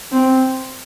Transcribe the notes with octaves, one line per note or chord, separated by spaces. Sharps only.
C4